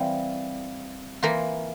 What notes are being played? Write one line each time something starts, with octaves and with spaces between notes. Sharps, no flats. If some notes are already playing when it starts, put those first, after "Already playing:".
Already playing: E3 G3 C4 F4
E3 A#3 F4 A#4